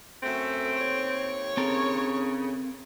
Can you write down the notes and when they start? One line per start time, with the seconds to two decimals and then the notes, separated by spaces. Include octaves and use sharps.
0.23 F#2 A3 C4
0.77 D#2 C#5
1.57 C#3 C4 A4 A#4